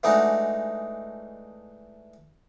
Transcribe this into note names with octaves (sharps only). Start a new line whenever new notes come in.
E3 G#3 A3 D4 D#4 F#4